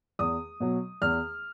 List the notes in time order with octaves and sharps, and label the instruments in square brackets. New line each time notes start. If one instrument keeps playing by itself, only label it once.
[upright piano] E2 D#6
B2 F#3
E2 F6